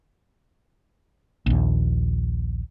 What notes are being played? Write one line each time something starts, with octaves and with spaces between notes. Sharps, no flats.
A#1 D#2